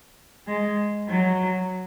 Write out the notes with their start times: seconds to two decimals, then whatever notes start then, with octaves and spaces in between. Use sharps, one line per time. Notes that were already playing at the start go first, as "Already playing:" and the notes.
0.47 G#3
1.09 F#3